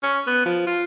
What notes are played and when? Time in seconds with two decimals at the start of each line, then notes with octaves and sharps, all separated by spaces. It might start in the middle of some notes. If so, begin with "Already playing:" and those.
0.03 C#4
0.27 B3
0.46 F3
0.67 F4